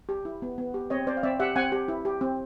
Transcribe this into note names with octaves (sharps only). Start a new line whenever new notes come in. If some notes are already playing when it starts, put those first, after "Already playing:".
G4
E4
B3
B3
G4
C4 C#5 D#5
C4 C5 D5
F5
C4 D5 E5
G4 E5 F#5
C4 F#5 G#5
G4
E4
G4
C4